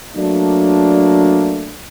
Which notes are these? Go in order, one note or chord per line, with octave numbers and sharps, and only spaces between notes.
F#3 A3 A#3 D4